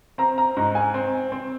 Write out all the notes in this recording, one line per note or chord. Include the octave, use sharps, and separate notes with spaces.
C4 A#5
A#5
G#2 A#5
G#5
C4
C4